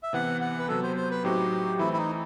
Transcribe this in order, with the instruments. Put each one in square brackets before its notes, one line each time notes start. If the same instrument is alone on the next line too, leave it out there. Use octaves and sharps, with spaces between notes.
[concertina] E5
[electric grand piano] C3 E3 B3 [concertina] F#5
[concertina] F#5
B4
[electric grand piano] C3 F#3 B3 [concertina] A4
[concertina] C5
C5
B4
[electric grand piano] A2 F#3 C4 D#4 F#4 [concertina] G4
[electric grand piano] E3 A3 C4 [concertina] E4
[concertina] E4
D#4